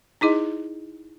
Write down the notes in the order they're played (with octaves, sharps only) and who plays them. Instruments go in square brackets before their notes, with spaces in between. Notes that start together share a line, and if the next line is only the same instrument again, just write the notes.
[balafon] D#4 E4 G#4 D#5